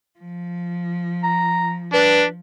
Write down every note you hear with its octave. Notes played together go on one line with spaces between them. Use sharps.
F3
A#5
D4 B4